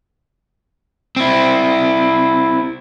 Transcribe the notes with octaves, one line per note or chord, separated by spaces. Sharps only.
C4 E4